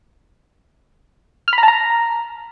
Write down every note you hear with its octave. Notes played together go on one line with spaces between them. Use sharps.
F6
B5
A#5
A5
A#5